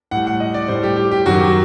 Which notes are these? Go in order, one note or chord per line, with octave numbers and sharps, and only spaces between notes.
A2 G3 F#5
F#5
D#5
D5
A2 G3 C5
G4
G4
G4
F#2 D#3 F#3 F#4
G4